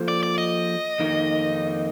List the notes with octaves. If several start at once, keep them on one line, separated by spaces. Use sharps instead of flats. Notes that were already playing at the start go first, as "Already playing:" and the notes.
Already playing: F3 A#3 F4 A4 C5
D5
D5
D#5
F2 D#3 A#3 D#4